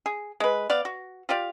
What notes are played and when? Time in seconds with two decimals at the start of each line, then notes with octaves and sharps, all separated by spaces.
0.06 G#4
0.40 G#3 B4
0.70 B3 D5 F5
0.85 F#4
1.29 F4 G4 D5 F5